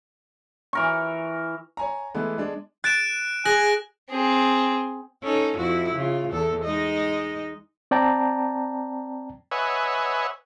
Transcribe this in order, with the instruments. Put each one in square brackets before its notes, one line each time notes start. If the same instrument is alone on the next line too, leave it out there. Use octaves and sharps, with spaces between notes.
[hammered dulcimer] E3 A#4 C#6
[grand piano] C#5 G#5 A#5
E3 G#3 A3 B3
G#3 D4
[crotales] F#6 D7 E7 [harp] A6
[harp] G#4 [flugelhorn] G#5 [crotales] F#6 A#6 F#7
[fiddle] C4 G#4
[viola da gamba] C#4 D#4 A4
F2 E4 F#4
C#3 F4
E2 A4
G#3 D#4 D#5
[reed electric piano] C4 D5 G5 A5 A#5
[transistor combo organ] B4 C#5 D#5 E5 F#5 G#5